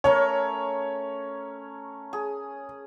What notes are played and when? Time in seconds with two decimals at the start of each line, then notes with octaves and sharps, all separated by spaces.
0.04 A3 C#4 A#4 C#5
2.13 G#4